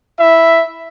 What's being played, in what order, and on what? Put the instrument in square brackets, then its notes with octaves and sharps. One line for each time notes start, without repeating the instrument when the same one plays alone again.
[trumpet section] E4 E5